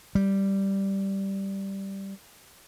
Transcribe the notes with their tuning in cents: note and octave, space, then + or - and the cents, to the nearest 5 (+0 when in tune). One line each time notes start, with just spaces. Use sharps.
G3 -5